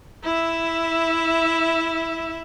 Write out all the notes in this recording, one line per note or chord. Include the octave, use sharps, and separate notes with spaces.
E4 E5